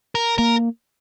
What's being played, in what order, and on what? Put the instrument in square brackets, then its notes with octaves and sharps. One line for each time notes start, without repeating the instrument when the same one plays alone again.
[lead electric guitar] A#4
[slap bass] A#3 [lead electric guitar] A#4